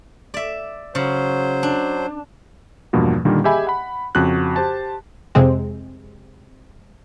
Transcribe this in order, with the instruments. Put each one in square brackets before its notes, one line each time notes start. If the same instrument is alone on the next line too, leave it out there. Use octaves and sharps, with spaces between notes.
[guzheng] D5 E5
[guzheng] C#3 [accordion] F#3 C5
[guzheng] D4
[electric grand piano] E2 G2 B2 F3 A#3
A#2 D3 D#3 G3 A#3
G4 G#4 D#5 E5 G#5 B5
F#5 B5
F2 C#3 F#4 F#6
G4 C5 A5
[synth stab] F2 C3 G#3 C4